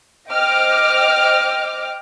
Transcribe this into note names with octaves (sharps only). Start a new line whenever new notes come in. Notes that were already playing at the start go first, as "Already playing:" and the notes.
C5 D#5 G5 D6 F6